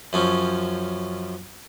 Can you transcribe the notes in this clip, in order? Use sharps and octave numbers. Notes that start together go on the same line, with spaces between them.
F#2 F3 C#4